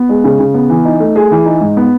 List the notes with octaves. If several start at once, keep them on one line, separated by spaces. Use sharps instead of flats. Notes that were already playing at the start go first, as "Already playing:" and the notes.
Already playing: B3
G#3
C#3
C#3
B3
E3
D#4
A3
G#4
E3
D#4
G#2
B3